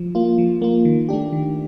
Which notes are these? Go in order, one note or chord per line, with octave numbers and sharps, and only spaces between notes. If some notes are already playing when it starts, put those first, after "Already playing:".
Already playing: F3
A#3 F4
F3
A#3 F4
D#3
A3 D4 G4
D#3